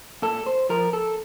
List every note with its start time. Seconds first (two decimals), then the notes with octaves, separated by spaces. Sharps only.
0.22 A#2 A4
0.46 C5
0.69 F3 A#4
0.93 A4